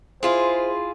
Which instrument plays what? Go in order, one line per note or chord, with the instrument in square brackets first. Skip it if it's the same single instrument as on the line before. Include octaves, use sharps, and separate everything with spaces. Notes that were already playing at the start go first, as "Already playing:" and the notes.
[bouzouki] E4 F4 G#4 [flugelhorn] C5